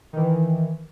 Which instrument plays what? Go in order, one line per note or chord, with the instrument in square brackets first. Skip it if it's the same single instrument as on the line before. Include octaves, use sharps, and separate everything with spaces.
[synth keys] D#3 E3